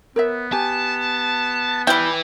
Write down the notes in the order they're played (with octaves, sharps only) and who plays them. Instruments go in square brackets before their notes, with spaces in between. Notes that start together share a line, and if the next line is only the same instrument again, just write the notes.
[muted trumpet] B3 [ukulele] A#4 C#5 E5
[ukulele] G4 G#5 [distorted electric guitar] A5
[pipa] G3 G5 [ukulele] E4 [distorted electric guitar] B4 E5